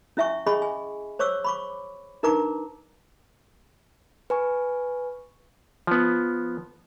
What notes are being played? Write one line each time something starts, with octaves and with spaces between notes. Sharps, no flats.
C#4 E4 E5 G#5 C#6
C#4 G#4 D#5 G#5 B5 C#6
G#5
C5 C#5 C#6 D6 E6
B5 C#6 D6
D4 D#4 A#4 B4 A#5 D6
B4 G#5 C#6
F3 B3